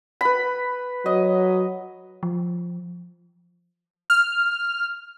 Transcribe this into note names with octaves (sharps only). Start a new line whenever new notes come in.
B4 B5
F#3 D#5
F3
F6